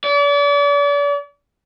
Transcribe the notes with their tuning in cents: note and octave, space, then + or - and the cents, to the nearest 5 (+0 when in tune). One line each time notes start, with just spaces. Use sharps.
D5 -40